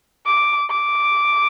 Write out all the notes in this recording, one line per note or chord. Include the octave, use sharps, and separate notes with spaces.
D6
D6